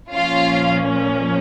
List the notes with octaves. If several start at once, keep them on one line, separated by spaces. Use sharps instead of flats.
A#2 F3 A#3 C#4 F4 F5